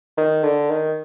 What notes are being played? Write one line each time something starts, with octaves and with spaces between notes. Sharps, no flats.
D#3
D3
D#3